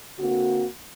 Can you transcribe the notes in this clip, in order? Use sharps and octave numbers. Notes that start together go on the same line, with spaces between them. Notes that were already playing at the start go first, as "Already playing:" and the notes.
D3 A#3 C4 F#4